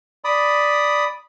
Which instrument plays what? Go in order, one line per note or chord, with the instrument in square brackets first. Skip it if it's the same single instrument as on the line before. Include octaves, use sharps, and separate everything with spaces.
[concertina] D5 B5 D#6